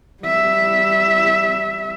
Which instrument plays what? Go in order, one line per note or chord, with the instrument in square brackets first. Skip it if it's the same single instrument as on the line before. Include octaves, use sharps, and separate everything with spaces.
[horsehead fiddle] G3 E5